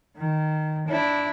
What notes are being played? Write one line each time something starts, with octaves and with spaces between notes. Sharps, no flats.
D#3
D4 E4